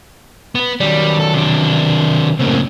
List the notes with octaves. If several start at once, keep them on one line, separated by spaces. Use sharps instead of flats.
B3 B4
D#3 F#3 G3 D5
A4
C3 D4
F#2 A2 C#3 A#3 C4